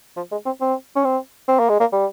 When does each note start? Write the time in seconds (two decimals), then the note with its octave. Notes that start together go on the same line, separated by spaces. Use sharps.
0.16 F3
0.31 G#3
0.46 C4
0.61 C4
0.96 C#4
1.04 C4
1.48 C4
1.59 A#3
1.69 G#3
1.80 A#3
1.92 G3